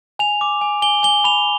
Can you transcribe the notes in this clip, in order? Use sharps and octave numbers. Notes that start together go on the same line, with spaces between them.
G#5 F7
D6
G#5
G#5 G7
G#5 G7
B5 F7